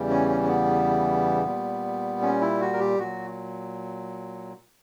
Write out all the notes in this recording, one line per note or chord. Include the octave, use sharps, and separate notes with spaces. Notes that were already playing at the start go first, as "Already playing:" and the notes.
Already playing: E2 C#3 E3 G3
C#4
C#4
C#4
B3
A#2 G3
C#4
E4
F#4
A#4
G4
A#2 F#3 F#4